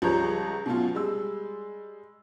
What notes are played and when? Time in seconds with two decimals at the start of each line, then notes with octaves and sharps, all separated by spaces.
0.02 C#2 F3 G3 C#5 A#5 G6
0.66 B2 F#3 A3 C#4 F4
0.95 G3 G#3 E6